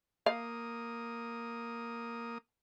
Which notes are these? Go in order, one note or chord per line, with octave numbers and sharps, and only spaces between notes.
A#3 F5 D#6